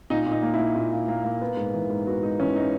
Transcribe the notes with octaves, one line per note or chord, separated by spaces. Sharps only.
A#2 D#4
A#2
D#4
A#3
E4
A#3
A#2
A#2
A#3
A#3
B3
G#2
E3
G#2
B3 F#4
G#2 D#4
E3 C#4
D#4